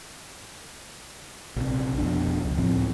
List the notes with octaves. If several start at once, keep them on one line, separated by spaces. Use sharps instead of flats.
A#1 C3
F1 F2 B2 D4
C#2
A2 F3 C4